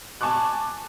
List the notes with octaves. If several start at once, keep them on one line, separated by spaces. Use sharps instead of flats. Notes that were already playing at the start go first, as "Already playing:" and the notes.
G#5 A5 C#6 D6 F#6